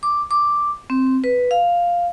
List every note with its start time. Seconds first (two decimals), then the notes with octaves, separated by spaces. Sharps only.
0.03 D6
0.31 D6
0.90 C4
1.24 B4
1.51 F5